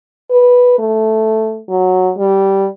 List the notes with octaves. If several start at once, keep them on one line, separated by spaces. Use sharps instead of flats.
B4
A3
F#3
G3